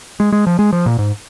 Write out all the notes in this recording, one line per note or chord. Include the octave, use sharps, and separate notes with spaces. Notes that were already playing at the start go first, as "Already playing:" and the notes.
G#3
G#3
F3
G#3
F3
A#2
G#2